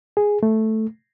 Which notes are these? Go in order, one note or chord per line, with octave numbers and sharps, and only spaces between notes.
G#4
A3